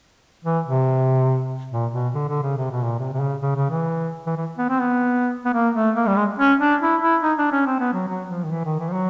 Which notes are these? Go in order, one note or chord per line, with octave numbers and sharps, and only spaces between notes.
E3
C3
A#2
B2
D3
D3
C#3
C3
B2
A#2
C3
C3
C#3
C#3
C#3
E3
E3
E3
B3
C4
B3
B3
A#3
A3
A#3
G3
G#3
C#4
D4
E4
E4
D#4
D4
C#4
C4
B3
F#3
F#3
F3
D#3
E3
D#3
E3
F3
F#3